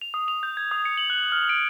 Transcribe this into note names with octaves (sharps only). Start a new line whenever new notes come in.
F7
D#6
F7
G6
G#6
D#6
C#7
F#7
F#6
F6
D7